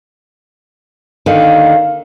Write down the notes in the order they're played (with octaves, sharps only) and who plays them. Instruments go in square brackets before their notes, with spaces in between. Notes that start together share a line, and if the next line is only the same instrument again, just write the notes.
[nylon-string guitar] D#2 D3 D#3 [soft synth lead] F5